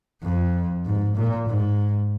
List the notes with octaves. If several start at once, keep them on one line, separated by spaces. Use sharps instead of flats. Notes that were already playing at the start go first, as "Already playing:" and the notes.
F2
G#2
A#2
G#2